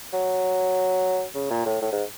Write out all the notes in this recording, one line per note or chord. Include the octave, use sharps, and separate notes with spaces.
F#3
C#3
A#2
A2
A2
G#2